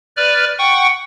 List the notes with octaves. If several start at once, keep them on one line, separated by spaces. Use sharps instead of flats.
B4 D5 F6
F#5 G5 C#6